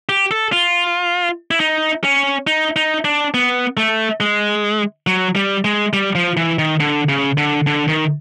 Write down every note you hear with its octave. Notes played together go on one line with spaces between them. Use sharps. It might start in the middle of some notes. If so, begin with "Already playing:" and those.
G4
A4
F4
E4
D#4
C#4
D#4
D#4
D4
B3
A3
G#3
F#3
G3
G#3
G3
F3
E3
D#3
D3
C#3
D3
D3
D#3